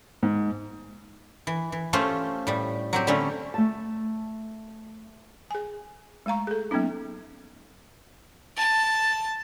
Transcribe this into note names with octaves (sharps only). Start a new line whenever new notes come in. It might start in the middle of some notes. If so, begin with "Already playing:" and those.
G#2
E3
E3
A3 C#4 F4 G4 C5
A2 G3
F#3 C4 G4
D3 G3 A3 C4 C#4
A3 A5
G#4 G#5
G#3 A3 F5 A#5 C#6
G#4 A4
F#3 A#3 B3 C#4 D#4
A5